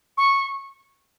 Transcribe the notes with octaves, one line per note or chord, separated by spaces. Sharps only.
C#6